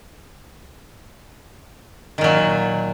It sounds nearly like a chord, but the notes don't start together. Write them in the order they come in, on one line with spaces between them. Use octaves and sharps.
D#3 A#2 F#3